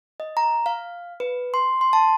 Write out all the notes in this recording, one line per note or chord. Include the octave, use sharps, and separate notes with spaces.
D#5
A#5
F5
B4
C6
C6
A5